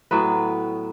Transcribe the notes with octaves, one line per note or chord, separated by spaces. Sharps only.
A2 F#3 B3 B4